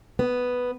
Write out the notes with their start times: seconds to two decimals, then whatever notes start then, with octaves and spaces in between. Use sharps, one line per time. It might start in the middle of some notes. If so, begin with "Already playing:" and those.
0.19 B3